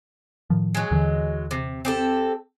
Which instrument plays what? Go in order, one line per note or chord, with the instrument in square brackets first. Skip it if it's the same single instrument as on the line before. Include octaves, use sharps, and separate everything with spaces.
[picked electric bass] A2 D#3 F3
[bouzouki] F#3 G#3
[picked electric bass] D#2 D3 E3
[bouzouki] C3
C4 G4 A4